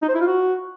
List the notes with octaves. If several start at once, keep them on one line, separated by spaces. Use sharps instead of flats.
D#4
C5
E4
F4
F#4